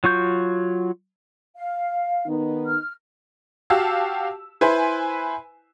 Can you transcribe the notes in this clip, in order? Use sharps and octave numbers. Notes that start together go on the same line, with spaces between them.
F#3 F4 C#6 G6
F5
D#3 B3 D#4
F6
F#4 G4 F5 A5 E6
E4 B4 C5 G#5